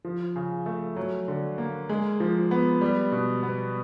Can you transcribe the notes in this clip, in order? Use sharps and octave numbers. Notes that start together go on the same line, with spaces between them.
F3
C#3
A3
F#3
D3
A#3
G#3
F3
B3
G3
B2
B3